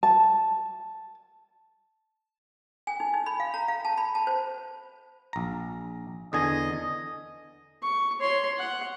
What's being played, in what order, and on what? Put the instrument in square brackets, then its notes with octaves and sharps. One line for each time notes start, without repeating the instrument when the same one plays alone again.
[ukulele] A5
[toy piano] G#5
D#4
D#4
B5
F5
A#5
F5
A5
B5
A5
C5
[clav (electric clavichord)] A#1 A#5
[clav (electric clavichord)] E2 D3 G#5 [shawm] D#5
[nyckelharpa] C#6
C#5 C6
F#5